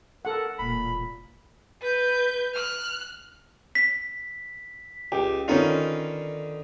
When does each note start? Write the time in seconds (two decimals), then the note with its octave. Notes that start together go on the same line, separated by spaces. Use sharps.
0.25 A4 A#4 F#5
0.59 E1 A#2 B5
1.81 B4 G6
2.54 F6 F#6
3.75 B6
5.12 C#2 G4
5.48 D3 D#3 C#4 D#4 F4 B4